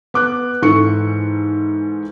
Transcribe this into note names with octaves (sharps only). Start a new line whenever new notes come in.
B3 D6 F#6
G#2 E3 A4 C#6 C#7